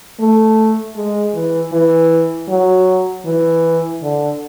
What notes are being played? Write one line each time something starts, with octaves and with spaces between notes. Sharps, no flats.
A3
G#3
E3
E3
F#3
E3
D3